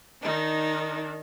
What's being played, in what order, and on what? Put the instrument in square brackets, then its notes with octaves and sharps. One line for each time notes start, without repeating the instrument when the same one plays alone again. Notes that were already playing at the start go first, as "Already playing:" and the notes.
[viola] D#3 D4 [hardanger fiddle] D#4